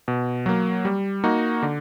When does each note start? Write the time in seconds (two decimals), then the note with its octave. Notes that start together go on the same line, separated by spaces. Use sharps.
0.08 B2
0.46 F#3 A#3
0.85 G3
1.24 A#3 D#4 F#4
1.63 D3